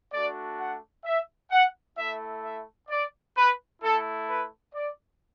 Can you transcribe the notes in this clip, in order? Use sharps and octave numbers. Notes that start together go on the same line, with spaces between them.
A3 D4 F#4 D5
F#5
E5
F#5
A3 E4 E5
E5
D5
B4
A3 E4 A4
B4
D5